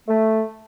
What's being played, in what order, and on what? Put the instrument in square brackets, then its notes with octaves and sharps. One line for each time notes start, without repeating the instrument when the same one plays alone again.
[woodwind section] A3